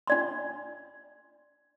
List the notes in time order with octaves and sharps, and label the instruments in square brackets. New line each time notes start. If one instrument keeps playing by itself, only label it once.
[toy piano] D4 D5 C6